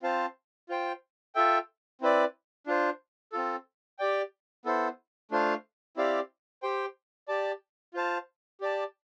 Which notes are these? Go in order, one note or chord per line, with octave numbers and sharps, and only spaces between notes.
C4 F4 C5 F5 A5
F4 C5 G5
F4 A4 E5 G5
C4 E4 B4 D5
D4 F4 C5
C4 F4 A4
G4 D5 G5
B3 E4 A4 C5
A3 D4 F4 C5 F5
C4 E4 G4 D5 F5
G4 C5 G5
G4 D5 A5
F4 C5 F5 A5
G4 D5 A5